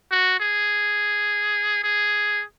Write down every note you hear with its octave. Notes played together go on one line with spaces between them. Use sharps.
F#4
G#4
G#4